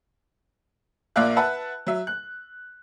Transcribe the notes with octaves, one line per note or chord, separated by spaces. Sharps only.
A#1 A#3 D5 E5 F5 F#6
B4 E5 F#5 A5
F#3 E5
F#6